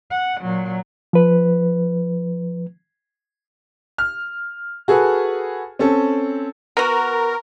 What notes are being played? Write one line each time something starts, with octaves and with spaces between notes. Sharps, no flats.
F#5
A#2 F#3
F3 B4
F6
F#4 G#4 A4 B4
C4 C#4 A4
B3 F#4 A#4